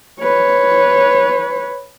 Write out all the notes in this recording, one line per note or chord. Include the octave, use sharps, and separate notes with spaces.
B4 C#5